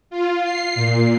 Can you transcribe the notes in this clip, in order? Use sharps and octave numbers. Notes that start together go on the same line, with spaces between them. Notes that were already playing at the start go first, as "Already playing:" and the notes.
F4
C7
A#2